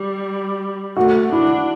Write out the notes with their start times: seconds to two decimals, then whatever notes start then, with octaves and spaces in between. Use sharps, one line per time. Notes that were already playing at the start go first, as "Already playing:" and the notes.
Already playing: G3
0.97 A3 F#4
1.33 D4 E4